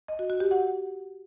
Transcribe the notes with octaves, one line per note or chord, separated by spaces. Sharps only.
D#5
F#4
F#4
G4
F#5